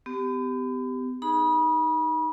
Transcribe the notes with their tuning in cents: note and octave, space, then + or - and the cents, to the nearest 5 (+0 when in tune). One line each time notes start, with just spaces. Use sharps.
B3 +40 G4 -5
D#4 +0 G#4 +0 B5 -35